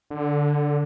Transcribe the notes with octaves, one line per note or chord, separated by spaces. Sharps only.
D3